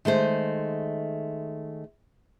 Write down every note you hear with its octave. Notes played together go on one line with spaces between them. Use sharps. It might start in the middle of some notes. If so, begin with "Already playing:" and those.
D#3 G#3 A3 C5